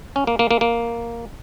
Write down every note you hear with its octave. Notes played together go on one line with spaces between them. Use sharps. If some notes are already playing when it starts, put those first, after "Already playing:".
C#4
A#3
A#3
A#3
A#3